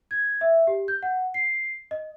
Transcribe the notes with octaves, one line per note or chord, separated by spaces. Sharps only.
G#6
E5
G4
G6
F#5
C7
D#5